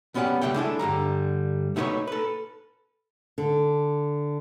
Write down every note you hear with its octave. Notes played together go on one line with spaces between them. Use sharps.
B1 B3 C#4 G4 D5 F#5
C#2 A3 G4 E5 F#5 G5
G#3 D4 E4 A4
G2 D3 G3 A#5
A3 D#4 E4 F#4 B4 C#5
A4 B4
D3